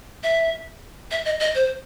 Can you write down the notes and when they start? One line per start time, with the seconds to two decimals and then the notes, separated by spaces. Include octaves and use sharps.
0.23 E5
1.11 E5
1.25 D#5
1.40 D#5
1.55 C5